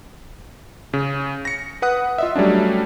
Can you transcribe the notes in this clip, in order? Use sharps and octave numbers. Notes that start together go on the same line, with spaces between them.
C#3
A#6 C#7
B4 F#5 D#6 F#6
F4 D#5 E5
F#3 G3 A3 C#4 D4